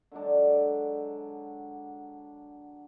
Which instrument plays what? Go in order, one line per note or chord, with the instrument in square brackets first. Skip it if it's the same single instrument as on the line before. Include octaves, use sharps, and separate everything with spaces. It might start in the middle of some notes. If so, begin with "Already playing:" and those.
[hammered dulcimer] D3 F#3 G#3 D4